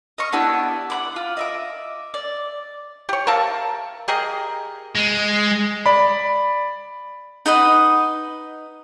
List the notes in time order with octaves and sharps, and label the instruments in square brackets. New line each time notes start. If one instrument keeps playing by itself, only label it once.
[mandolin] D#5 F5 C#6
B3 D4 E4 G4
F#5 B5 D6
F4
D#5 E5 D6
D5
[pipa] G4 C#5
A#4 E5 F5 A5
G4 G#4 A#4 D#5
[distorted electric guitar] G#3
[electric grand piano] D5 B5
[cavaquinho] D#4 B4 D#5 F#5